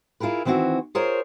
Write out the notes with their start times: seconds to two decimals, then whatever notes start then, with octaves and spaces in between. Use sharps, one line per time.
0.20 E4 F4 G#4 A#4 B4
0.45 D#3 E3 C4 E4 F#4
0.95 F4 G#4 A#4 C5 C#5